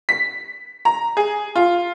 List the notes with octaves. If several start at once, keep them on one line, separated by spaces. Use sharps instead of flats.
B6
A#5
G#4
F4